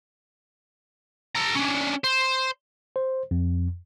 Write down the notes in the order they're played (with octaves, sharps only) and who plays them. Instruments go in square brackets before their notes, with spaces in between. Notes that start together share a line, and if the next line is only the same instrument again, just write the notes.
[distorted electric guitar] A4 A#5
C#4 D4
C5
[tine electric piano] C5
F2